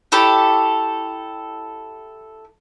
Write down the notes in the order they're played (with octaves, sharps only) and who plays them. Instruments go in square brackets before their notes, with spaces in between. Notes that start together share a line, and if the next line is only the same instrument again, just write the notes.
[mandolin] E4 G4 A4 C#5